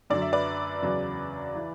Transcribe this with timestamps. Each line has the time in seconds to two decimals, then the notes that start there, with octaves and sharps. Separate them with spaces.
0.10 F#2 D3 F#3 D5
0.22 E5
0.33 B4 D5
0.82 E2 C#3 F#3
1.55 E3